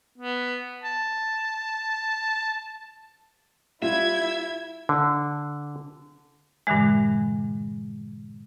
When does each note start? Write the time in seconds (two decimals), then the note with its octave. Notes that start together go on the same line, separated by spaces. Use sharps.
0.18 B3
0.83 A5
3.82 G3 E4 F4 E5 G#6
4.89 D3
6.67 G2 A#2 D3 E3 G#3